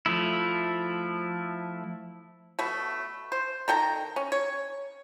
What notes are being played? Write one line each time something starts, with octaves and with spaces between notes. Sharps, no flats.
F3 A3 E4
B2 A3
C5
D#3 A4 G5 A#5
C#4
C#5